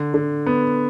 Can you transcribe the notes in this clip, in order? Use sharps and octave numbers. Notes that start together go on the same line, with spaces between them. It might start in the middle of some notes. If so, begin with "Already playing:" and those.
Already playing: D3
D3
B3